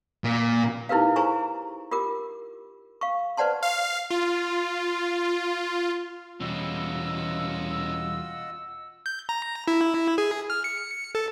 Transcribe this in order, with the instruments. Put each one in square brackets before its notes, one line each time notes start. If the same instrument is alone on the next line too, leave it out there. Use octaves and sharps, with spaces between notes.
[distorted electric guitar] A#2
[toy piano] D#4 E4 G4 A#4 B4 F5
E4 G#4 C5 G#5 A#5 C#6
F4 G4 A#4 D6
F5 C#6
B4 C5 D5 F#5 A5 C6
[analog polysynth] F5
F4
[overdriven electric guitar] E2 B2 [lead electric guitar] G3 C#4 [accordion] F4 D#5 F#5 [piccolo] E6
[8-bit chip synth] G6
A#5
E4
G#4
F6
C#7
A4